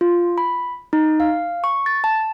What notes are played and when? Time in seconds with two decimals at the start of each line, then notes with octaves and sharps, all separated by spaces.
0.01 F4
0.38 B5
0.93 D#4
1.20 F5
1.64 C#6
1.86 A6
2.04 A5